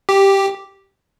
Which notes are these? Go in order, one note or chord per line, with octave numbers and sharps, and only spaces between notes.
G4